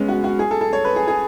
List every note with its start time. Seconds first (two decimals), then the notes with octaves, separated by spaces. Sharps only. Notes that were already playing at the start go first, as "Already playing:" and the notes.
Already playing: G#3 B3 C#4
0.09 F#4
0.24 F#4
0.39 G#4
0.51 A4
0.61 A4
0.73 C#5
0.85 B4
0.96 G#4
1.08 G#4